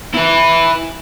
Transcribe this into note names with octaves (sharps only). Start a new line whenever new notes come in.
E4 B4